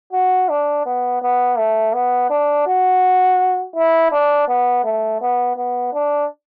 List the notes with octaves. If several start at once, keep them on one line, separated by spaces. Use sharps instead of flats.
F#4
D4
B3
B3
A3
B3
D4
F#4
E4
D4
B3
A3
B3
B3
D4